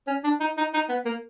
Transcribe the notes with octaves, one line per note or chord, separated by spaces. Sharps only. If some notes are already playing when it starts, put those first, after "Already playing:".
C#4
D4
D#4
D#4
D#4
B3
A#3